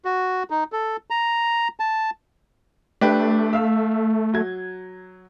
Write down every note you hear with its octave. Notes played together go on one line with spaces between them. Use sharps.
F#4
D#4
A4
A#5
A5
A3 D4 G4 B4
E5 F5 E6
F#3 G#6